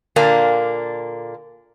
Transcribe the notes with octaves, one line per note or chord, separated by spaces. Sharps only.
A#2 D3 A#3 D4